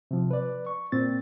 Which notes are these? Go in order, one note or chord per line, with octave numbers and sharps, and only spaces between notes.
C3 F3
B4 D5
C#6
A#2 C4 A6